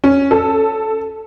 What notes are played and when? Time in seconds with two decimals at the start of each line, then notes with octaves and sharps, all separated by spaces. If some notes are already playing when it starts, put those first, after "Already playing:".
0.04 C#4
0.31 A4